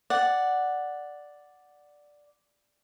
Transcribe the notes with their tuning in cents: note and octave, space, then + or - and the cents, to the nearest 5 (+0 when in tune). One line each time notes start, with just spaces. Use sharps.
D5 +0 F#5 +0